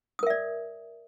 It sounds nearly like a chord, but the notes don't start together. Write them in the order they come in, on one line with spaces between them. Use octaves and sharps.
D#6 A#4 E5 D5